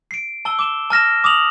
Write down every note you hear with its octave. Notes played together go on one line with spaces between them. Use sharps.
C7 D7
A5 E6 G7
D6 E7 G7
A5 F6 A#6 E7
D6 D#6 A#6 F7 F#7